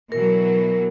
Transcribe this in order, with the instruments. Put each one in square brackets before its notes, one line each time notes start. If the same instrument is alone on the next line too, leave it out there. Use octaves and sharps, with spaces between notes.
[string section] B2 E3 F#3 [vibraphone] A#4